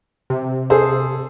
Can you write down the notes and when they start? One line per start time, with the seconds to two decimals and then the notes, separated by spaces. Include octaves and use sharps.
0.30 C3
0.70 G#4 A4 C5